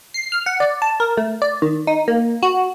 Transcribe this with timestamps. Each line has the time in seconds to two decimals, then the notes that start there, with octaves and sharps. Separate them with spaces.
0.14 C7
0.32 F6
0.46 F#5
0.60 D5
0.82 A5
1.00 A#4
1.17 A3
1.42 D5
1.62 D#3
1.87 D#4
2.08 A#3
2.43 F#4